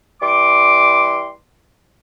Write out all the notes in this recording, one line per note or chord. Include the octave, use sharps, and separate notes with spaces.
E3 G3 C6 D6